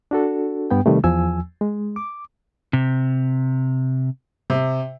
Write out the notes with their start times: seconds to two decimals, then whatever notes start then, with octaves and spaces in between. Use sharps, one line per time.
0.11 D4 F#4 A4
0.71 G2 B3 G5
0.86 C3 D#3 G3 A3
1.04 E2 F3 G#5 E6
1.61 G#3
1.96 D6
2.73 C3
4.50 C3